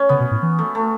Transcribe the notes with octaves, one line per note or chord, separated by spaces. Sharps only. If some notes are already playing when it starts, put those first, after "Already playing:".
Already playing: C#4
C#3 B3
B2
A2
E3
A3
A3